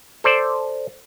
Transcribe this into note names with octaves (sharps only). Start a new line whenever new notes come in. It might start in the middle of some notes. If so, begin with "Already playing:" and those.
A4 C5 D5